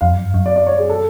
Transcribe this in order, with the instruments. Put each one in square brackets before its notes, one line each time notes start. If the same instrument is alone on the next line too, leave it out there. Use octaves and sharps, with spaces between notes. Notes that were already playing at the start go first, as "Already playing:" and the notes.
[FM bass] F2 [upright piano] F5
[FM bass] F#2
G2
F#2
[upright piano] D5
D5
C#5
G#4
A4